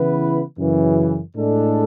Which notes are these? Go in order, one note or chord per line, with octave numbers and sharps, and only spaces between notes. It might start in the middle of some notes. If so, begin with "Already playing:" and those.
Already playing: C#3 E3 B3 E4 B4
F#2 C#3 E3
A2 G#3 D4 A4